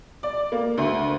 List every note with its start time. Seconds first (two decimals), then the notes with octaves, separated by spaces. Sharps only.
0.23 D5
0.52 A#3
0.78 D2